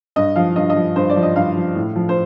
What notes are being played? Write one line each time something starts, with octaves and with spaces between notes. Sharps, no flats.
G2 D#5
F3 F5
G2 D#5
D#5
F3
G2 C5
D5
F3
D#5
G2 F5
F3
A2
F3
C5